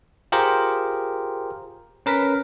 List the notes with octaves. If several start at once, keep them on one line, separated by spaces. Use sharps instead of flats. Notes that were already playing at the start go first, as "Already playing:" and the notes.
F4 G4 G#4 A#4 C5
C#4 A#4 B4 B6